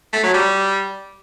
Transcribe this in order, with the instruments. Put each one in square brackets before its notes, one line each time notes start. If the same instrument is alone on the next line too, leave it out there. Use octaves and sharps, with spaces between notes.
[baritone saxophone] A3
F#3
G3